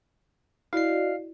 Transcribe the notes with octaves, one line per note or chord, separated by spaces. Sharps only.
E4 F#4 D5 D#5 F5 C7